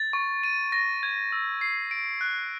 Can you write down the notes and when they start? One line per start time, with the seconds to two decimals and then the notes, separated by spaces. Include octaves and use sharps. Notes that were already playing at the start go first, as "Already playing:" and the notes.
Already playing: A6
0.13 C#6
0.43 D#7
0.72 A#6
1.03 G#6
1.32 E6
1.61 C7
1.91 D7
2.21 F#6